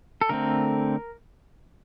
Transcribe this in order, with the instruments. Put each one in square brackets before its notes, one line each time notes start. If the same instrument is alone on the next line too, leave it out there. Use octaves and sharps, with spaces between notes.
[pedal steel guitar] A4
D3 A3 C4 A#4